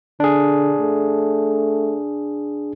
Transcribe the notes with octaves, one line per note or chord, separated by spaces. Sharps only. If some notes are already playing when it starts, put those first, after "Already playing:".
D3 D4 G#4
A3